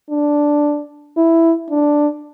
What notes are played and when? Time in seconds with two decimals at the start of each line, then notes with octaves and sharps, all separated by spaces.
0.11 D4
1.17 E4
1.70 D4